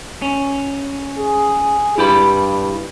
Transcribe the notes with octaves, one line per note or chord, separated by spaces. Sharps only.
C#4
G#4
G2 E4 G4 B5